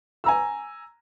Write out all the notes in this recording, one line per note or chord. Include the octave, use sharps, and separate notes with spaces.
G#5 A#5 E6